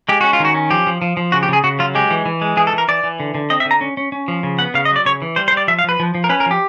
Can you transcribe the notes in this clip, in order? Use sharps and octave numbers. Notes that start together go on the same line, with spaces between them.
G#3 G4
C#4 F#4
F4
D#3 F#4
C#4
F3 G4
F3
F3
F3
C#3 F#4
G4
C#3 G#4
C#3 F#4
F#3 F4
G#3 G4
E3
E3
G#3
E3 G#4
A4
E3 A#4
E3 D5
E3
D3
D3
C4 D#5
E5
D3
A#5
C#4
C#4
C#4
F3
C#3
B3 F#5
C#3 F5
D#5
F#3 D5
C#3 C#5
E3
G3 C5
C5
G3
D5
F3 E5
F5
F3 B4
F3
F3
A#4
C#4 B4
A#4
F3 G4